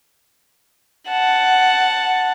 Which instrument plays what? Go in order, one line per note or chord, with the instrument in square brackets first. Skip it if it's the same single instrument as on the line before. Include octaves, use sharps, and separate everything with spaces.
[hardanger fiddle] F#5 A5